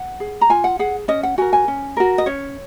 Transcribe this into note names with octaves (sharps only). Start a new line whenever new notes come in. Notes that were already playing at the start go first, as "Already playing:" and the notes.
Already playing: F#5
G#4
A#5
F4 G#5
F#5
G#4 F#5
C#4 D#5
F#5
F#4 A#4 G#5
G#5
C#4
F#4 A#4
D#5
C#4 C#5